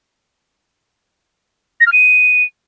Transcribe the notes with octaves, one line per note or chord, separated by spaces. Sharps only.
A#6
F6
D#7